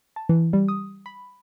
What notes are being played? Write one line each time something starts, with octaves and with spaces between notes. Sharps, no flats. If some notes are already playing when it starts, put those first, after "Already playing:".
A5
E3
G3
D#6
B5